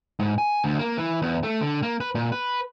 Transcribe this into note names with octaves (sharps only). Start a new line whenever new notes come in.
G#2
G#5
D2
A#3
E3
E2
A3
D3
A#3
B4
A#2
B4